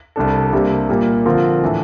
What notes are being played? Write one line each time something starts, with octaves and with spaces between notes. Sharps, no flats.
C2 C3 G3 D4 A4
C3 G3 A#3 D4
A#2 G3 A#3
D3 F3 C4 F4 A#4
A2 E3 A3 D4